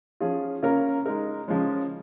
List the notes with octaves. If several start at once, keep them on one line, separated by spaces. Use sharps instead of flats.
F3 C#4 F4 G#4
C#3 A#3 C#4 F4 A#4
G#3 D#4 A#4
C#3 F3 G#3 C#4